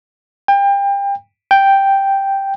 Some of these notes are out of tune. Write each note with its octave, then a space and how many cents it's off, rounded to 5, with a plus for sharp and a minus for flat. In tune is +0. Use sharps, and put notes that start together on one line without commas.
G5 +30
G5 +0